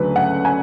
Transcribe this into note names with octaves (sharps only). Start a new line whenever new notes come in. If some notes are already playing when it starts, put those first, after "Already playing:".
Already playing: D2 C#3 F#3 A3 D4 B4
F#5
G#5